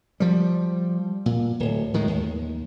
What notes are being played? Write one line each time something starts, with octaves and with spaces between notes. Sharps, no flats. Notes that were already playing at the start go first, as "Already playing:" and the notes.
F3 G3
A#2
D1
A2 D#3 G#3
D#2